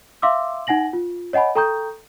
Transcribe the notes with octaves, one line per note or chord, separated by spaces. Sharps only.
E5 F5 C6 D6 E6
D#4 F#5 G#5 A#6 F#7
F4
C#5 D#5 F#5 G#5 B5
A4 G5 A#5 C#6 D#6 G6